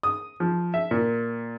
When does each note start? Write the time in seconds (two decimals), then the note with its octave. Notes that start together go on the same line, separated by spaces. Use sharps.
0.03 D#6
0.40 F3
0.74 E5
0.91 A#2